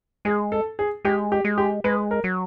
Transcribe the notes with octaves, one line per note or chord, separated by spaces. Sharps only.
G#3 G#4
A4
G#4
G#3 G4
G4
G#3
G4
G#3 B4
A#4
F#3